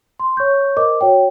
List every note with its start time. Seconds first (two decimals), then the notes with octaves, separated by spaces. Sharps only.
0.20 C6
0.37 C#5 C#6 G6
0.77 A#4 C5 D#5 D6
1.01 F#4 C#5 G5